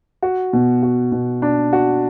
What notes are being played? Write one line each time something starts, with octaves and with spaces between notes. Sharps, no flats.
F#4
B2
F#4
B2
D4
F#4